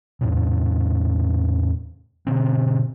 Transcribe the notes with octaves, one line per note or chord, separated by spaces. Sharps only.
E2 A2 C3
B2 D3 B3 C4